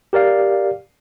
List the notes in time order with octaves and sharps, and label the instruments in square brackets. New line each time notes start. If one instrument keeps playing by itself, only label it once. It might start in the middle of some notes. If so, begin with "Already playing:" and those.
[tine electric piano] G4 A#4 D5 F5